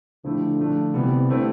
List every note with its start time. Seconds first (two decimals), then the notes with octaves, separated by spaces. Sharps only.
0.24 D3 F3 A3 E4 G4
0.59 F3 A3 D4
0.94 C3 E3 G3 B3
1.29 D3 A3 C4 E4